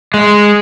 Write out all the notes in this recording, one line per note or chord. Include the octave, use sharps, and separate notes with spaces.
G#3